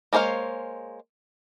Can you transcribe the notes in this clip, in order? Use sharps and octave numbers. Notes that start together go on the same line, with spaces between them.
G#3 A#3 C5 C#5 F5